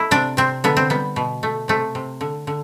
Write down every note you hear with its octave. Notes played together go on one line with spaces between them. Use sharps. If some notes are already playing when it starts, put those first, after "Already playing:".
Already playing: A3 E4
C3 D4
C3 C4
D3 B3
C4
G3 B3
B2
A3
C3 A3
C3
D3
D3